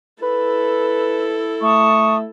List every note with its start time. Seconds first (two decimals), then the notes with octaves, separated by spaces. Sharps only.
0.23 E4 A4 B4
1.62 A3 A5 C#6 D#6